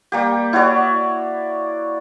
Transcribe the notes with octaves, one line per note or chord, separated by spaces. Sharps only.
G3 A#3 G4
E4 F#4 C#5 D5